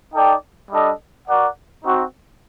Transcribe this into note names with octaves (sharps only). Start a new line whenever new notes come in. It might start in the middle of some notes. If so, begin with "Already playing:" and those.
D#4 A4 D5 G5
G3 D4 A4 D#5
F#4 A#4 D5 F#5
C4 D#4 F#4